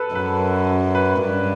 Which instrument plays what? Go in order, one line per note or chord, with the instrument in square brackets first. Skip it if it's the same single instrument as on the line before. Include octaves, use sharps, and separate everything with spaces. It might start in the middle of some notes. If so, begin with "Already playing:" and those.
Already playing: [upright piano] A4 B4
[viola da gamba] F#2 [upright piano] B4
[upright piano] B4
[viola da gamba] G2